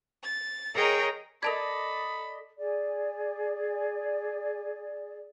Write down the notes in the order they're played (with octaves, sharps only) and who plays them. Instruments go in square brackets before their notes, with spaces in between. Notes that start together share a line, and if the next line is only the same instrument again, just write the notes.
[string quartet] A6
G#4 A#4 C#5 D#5 G5 A#5
[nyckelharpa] A4 [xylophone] A#4 A5 G#6 [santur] D5 D#5 [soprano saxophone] B5
[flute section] G#4 D5